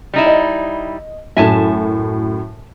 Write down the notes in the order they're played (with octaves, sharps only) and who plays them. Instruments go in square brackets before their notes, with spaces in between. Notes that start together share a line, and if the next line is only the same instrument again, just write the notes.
[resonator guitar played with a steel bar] G3 D#4 E4
[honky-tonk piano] D#5
[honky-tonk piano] F#2 A2 [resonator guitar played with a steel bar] E5 G#5 A5